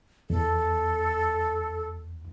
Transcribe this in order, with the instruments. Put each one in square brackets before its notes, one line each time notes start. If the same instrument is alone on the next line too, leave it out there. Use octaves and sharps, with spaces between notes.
[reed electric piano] E2 [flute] A4